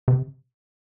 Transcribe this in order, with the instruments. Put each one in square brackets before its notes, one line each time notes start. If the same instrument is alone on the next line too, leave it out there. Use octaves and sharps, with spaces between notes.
[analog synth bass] C3